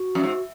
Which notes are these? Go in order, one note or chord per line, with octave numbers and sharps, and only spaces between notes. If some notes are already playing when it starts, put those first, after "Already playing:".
Already playing: F#4
F#2
G#2